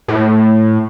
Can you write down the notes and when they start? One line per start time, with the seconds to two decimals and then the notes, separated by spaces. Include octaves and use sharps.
0.08 A2